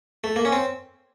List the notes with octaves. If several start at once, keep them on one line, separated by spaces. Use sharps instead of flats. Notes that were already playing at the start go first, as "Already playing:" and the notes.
A3
A#3
C#4
C4